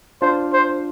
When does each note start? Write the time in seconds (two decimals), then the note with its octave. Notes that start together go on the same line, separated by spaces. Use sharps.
0.22 D4 F4 C5
0.53 C5